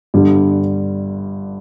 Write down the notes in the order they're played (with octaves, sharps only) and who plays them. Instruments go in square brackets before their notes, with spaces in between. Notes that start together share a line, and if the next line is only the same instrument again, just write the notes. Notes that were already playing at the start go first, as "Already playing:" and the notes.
[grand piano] G1 G2 D3 G3